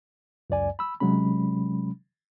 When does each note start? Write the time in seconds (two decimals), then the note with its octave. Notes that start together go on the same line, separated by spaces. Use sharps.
0.50 C#2 F#2 D5 G#5
0.79 B5 E6
1.00 C3 F#3 G#3 C#4 B5